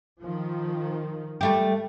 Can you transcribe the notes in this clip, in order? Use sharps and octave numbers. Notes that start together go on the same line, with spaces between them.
D#3 F3
G3 A3 G4